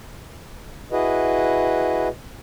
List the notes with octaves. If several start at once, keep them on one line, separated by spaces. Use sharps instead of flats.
E4 F#4 G#4 B4 D#5